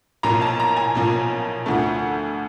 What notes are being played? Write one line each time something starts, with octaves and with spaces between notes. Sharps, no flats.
B1 A#2 F3 A#5
A5
A#5
G#5
B1 A#2 F3
D2 D3 F3 A3